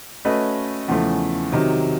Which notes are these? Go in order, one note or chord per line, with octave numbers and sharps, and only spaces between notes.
A3 C#4 F#4 B4 D#5
E2 C#3 F3 A3
C3 D#3 F#3